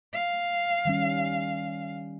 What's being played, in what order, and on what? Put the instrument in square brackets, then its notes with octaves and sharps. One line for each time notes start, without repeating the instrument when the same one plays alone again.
[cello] F5
[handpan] D#3 G3 C#4